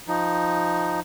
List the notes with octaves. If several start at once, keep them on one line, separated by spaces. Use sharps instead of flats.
F3 D#4